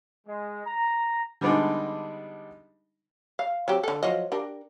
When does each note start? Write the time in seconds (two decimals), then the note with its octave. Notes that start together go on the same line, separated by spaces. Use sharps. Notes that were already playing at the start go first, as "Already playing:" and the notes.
0.27 G#3
0.66 A#5
1.41 D3 G3 G#3 B3 D4 D#4
3.39 F5
3.68 F#3 C4 G4
3.83 D3 A4
4.03 F3 F#3 D#5
4.32 D4 G4 A#4